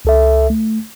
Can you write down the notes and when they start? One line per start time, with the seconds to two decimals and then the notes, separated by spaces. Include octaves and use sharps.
0.05 C#2 A4 E5
0.50 A3